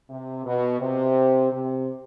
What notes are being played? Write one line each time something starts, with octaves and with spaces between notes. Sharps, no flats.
C3
B2
C3
C3